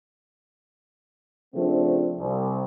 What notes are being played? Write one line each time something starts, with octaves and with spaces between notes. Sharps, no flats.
C#3 F3 A3 B3 C4 D4
C2